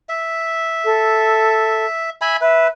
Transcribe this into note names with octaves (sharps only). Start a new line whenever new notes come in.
E5
A4
E5 G#5 B5
B4 E5